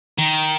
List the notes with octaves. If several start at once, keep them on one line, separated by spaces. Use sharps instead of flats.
D#3